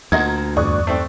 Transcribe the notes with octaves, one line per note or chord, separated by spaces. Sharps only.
D2 A#2 F#4 D#5 A#5 G#6
E2 G2 D5 C#6 D#6 F#6
A3 C4 G5